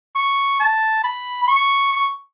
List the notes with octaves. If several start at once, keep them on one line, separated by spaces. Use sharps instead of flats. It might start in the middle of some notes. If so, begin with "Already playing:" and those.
C#6
A5
B5
B5
C#6
C#6